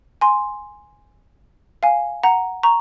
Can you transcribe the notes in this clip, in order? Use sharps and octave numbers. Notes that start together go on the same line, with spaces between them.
G#5 C6
F5 G#5
F#5 A#5
A#5 C#6